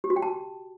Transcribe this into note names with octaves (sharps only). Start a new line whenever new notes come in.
G4
F#4
G5
A5